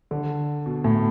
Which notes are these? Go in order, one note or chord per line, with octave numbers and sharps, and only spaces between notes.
D3
B2
A2